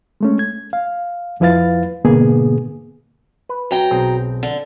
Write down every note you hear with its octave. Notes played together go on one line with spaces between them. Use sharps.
G#3 A3 C#4
G#6
F5
F2 F3 E4 B4 F5 A6
G#2 B2 D3 A#3 B3 G#4
B4
F#3 G5 A#5
B1 C4 G#4
D3